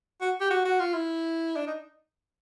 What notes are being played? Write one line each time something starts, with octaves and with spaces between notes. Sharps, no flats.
F#4
G4
F#4
F#4
F4
E4
D4
D#4